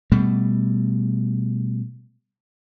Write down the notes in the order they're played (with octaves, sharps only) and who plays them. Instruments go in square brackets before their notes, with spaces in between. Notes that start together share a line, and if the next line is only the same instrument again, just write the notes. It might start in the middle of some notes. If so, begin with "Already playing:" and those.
[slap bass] B2 G3 A3